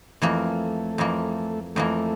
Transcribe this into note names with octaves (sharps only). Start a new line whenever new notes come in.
F2 E3 A3 A#3
F2 E3 A#3
F2 E3 A3 A#3